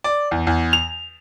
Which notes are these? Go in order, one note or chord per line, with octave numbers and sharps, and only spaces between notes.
D5
E2
E2
F7